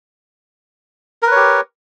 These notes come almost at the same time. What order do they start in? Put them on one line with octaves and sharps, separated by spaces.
A#4 B4 C#5 G4